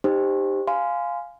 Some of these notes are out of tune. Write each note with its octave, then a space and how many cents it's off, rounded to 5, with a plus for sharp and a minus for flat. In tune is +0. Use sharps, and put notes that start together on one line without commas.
D#4 -20 G4 +10 C5 +0
F5 +0 G#5 +0 C6 -30